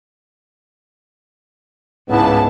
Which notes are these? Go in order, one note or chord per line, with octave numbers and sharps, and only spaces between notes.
C#2 G#2 B3 E4 A5